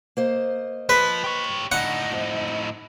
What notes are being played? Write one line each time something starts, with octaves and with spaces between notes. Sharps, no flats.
A#3 C5 D#5
F3 B4
G4 C#5
A2 D3 D#4 F#5
F2